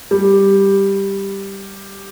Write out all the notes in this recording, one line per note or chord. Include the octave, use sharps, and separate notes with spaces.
G3